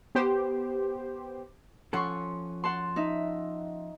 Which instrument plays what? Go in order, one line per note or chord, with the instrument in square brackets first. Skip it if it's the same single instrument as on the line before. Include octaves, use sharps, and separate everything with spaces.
[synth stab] B3 G4 C5
[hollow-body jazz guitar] F3 C#4 A4 [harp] F#5 C6 C#6
[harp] F#5 A5 C6
D#4 E5